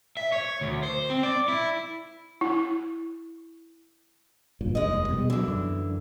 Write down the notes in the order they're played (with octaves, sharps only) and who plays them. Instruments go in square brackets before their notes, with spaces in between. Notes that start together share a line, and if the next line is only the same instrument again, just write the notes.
[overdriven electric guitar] E5
C#5
D2
C5
C4
D5
E4
[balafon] E4
[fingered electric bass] F#1 G2 A#2
[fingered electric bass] F1 D#2 [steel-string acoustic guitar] G#3 D#5
[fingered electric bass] B2 G3
[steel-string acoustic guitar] D3 E3 [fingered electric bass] F#3
[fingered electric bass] F#2